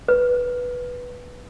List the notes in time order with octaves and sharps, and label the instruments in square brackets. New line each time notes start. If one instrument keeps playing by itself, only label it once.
[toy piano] B4